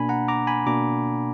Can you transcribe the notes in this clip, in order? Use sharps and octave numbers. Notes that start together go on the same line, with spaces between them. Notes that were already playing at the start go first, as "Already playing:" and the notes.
Already playing: B2 A#3 D4 G#5 B5
F#5 A#5
A#5 D6
G#5 B5
B2 A#3 D4 A#5 D6